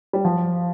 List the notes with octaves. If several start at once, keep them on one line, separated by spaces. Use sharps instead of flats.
G3
F3